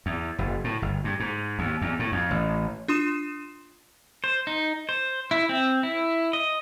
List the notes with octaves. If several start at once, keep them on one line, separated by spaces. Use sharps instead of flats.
E2
F#1
A2
G1
G2
G#2
D#2
E2
A2
F2
A1
D4 F4 C6 D#6 E7
C5
D#4
C5
E4
C4
E4
D#5